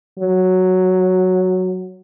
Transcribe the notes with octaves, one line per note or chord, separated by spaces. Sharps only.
F#3